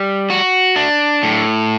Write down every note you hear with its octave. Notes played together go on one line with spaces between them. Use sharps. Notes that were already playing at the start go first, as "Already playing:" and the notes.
Already playing: G3
F#4
D4
A2